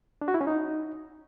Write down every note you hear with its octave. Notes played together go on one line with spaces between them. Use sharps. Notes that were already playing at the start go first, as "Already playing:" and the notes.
D4
F#4
E4
C#4
D#4